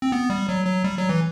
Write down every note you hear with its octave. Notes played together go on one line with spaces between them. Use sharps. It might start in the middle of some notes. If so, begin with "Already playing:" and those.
C4
B3
G3
F#3
F#3
G3
F#3
E3